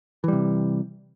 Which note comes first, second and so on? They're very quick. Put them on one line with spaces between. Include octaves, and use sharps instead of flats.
E3 G3 C3